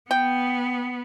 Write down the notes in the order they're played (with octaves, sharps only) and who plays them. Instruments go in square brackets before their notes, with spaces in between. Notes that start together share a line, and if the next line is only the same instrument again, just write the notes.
[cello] B3 [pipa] G5